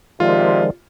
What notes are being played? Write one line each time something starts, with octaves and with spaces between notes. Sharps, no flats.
C3 D#3 F3 G#3 F4 D5